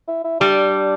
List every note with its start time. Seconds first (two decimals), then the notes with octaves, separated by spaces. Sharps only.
0.08 E4
0.24 E4
0.40 G3 D4